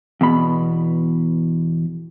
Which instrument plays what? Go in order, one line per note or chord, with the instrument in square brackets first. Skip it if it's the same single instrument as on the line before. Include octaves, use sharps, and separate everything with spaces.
[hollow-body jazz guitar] E2 B2 B5